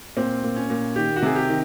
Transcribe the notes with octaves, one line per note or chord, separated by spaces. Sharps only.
A#2 C4
A#2
C#4
A#2
D#3 G4
F#4
C3 G#4
G4
D#3